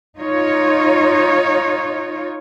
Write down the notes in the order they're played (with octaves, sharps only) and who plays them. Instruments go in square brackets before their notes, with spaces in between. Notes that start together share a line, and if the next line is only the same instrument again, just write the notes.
[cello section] D#4 F4 C#5